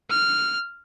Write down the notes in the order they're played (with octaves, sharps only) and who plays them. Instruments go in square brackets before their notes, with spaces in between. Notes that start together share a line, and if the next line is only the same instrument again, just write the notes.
[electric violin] F6